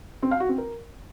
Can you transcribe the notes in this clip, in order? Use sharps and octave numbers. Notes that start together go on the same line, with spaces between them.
C4
F5
F#4
C4
A#4